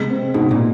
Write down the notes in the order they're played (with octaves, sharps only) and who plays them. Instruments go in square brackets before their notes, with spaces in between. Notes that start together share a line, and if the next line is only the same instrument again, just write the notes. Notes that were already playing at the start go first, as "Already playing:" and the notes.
Already playing: [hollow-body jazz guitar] C3 [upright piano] G#3 B3
[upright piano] C4
[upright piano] G#2 [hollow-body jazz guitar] B2
[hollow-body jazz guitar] A#2